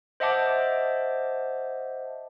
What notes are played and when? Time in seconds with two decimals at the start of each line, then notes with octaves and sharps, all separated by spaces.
0.20 C5 D#5 E5 F#5 A5 D6